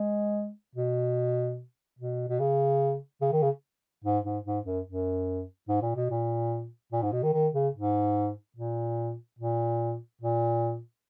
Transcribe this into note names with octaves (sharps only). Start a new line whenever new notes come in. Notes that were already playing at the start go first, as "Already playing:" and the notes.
Already playing: G#3
B2
B2
B2
C#3
C#3
D#3
C#3
G#2
G#2
G#2
F#2
F#2
G#2
A#2
B2
A#2
A#2
G#2
B2
D#3
D#3
C#3
G#2
A#2
A#2
A#2